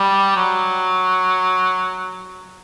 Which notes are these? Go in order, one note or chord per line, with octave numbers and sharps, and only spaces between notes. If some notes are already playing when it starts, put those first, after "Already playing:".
Already playing: G3
F#3